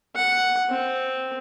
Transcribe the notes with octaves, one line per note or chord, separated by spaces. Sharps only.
F#5
C4